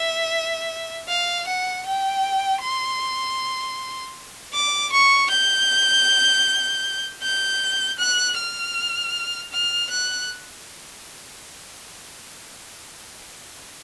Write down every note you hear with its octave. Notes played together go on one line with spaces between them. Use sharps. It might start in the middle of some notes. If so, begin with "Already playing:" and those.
Already playing: E5
F5
F#5
G5
C6
D6
C#6
G6
G6
F#6
F6
F6
F#6